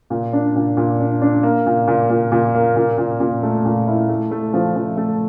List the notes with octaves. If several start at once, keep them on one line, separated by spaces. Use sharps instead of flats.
A#2
D4
A#2
A#2
D4
D4
A#3
A#2
A#2
A#2
A#2
A#3
A#2
A#2
A#2
A3
A#2
E4
A3
A3
F3
F3
A3